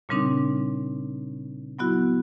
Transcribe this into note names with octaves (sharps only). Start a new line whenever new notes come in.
A#2 C#3 G3 C4 D4 D#4
F#3 B3 E4 F#4